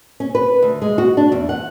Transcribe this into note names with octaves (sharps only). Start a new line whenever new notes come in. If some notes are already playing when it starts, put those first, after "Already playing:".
C#4
B4
D2
G#3
F#4
D4
E2
F#5